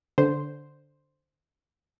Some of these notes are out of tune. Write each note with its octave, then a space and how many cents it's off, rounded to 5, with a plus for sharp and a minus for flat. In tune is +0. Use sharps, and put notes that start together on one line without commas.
D3 +0 C5 +0